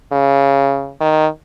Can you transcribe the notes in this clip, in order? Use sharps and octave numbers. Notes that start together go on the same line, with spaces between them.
C#3
D#3